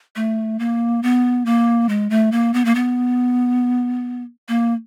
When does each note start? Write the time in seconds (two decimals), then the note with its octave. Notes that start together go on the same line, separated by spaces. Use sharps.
0.16 A3
0.59 A#3
1.03 B3
1.46 A#3
1.89 G#3
2.10 A3
2.32 A#3
2.54 B3
2.65 A#3
2.75 B3
4.48 A#3